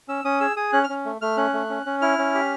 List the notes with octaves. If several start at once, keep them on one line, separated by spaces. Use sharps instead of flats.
C#4 E6
C#4 D#6
G#4 E6
G#4 D#6
C#4 F#6
F6
C#4
A3
A3 F6
C#4 F#6
A3
C#4
C#4
E4 F6
C#4
G4